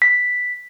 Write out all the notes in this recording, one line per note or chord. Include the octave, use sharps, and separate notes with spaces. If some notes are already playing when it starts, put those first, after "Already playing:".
B6